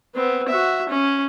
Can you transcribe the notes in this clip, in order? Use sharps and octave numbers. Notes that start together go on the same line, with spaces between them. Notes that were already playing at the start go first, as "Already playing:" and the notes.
B3 C4
F#4 E5
C#4